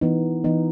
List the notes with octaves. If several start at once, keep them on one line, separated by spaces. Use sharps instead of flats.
E3 B3 D#4
E3 B3 D#4